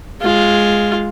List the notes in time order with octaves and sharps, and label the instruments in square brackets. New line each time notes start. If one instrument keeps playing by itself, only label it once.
[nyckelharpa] G#3 F4